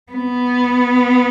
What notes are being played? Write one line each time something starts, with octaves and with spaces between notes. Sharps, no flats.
B3